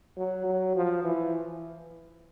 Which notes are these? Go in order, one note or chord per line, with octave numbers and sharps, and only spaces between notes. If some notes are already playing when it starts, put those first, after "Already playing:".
F#3
F#3
F3
E3